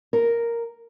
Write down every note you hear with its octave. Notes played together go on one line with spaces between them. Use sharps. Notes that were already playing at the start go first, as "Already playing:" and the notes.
A#4